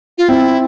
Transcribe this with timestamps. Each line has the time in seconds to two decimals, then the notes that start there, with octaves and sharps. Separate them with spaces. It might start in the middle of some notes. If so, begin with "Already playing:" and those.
0.18 F4
0.29 C4 E4